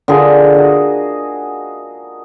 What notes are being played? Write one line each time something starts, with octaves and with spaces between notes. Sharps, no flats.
D3 F4 G#4 A#4
F#4 D#5